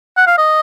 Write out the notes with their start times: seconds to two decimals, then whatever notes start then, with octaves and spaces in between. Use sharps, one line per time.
0.17 F#5
0.27 F5
0.38 D#5